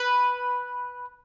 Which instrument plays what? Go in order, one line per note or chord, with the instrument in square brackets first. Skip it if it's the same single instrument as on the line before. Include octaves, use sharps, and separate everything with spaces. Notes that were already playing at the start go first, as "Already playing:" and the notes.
Already playing: [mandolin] B4